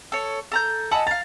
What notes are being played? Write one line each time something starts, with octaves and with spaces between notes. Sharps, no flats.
A4 C#5
A4 A#5 G6
D#5 F#5 G#5 A5 B5 E6
F5 A#5 A6